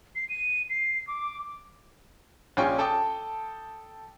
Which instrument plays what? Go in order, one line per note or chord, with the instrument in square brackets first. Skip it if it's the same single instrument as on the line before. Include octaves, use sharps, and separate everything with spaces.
[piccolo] C7
D#7
C7
D6
[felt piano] A#1 C#4 F4 G5 G#5 C#6
A4 G5 A5 D6 D#6